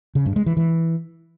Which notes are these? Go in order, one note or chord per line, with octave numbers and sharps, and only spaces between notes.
C#3
G2
G#3
E3
E3